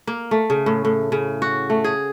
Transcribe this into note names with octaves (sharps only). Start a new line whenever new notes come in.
A#3
A3
C#3
A2
A2
C#3
F#4
A3
G#4